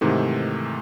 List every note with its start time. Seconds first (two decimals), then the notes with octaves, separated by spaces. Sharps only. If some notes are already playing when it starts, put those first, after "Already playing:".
0.01 G#2 C3 D#3 E3 A3